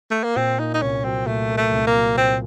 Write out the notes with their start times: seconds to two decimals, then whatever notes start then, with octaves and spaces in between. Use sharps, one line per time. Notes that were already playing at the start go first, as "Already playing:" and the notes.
0.11 A3
0.24 A#3
0.36 A#2 C4
0.59 A#3 D#4
0.74 D#4
0.82 C2 C#4
1.04 F#3 C4
1.26 A#2 A3
1.49 A#3
1.57 A3
1.72 C2
1.87 A#3
1.94 F#3
2.17 A#2 C4